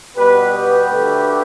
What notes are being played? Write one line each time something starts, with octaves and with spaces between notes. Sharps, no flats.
B2 G3 B3 G4 B4
G4 B4
D2 D3 A3